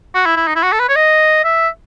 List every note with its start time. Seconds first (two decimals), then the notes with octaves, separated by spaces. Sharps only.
0.15 F#4
0.25 E4
0.37 E4
0.47 D#4
0.56 E4
0.63 F#4
0.72 A4
0.79 B4
0.89 C#5
0.96 D#5
1.44 E5